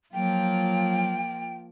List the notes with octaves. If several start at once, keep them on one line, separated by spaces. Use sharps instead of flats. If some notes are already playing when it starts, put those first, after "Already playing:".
F3 F#3 A#3 F4 G5